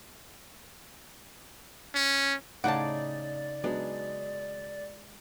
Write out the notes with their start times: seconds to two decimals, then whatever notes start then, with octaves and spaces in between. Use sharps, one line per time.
1.95 C#4
2.64 A2 C#3 D#4 D5 F#5 A5 D6
3.64 F#3 G#3 B3 D4